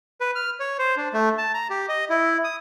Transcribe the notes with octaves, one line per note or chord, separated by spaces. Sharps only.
B4
F6
C#5
C5
D4
A3
A5
A#5
G4
D#5
E4
D#6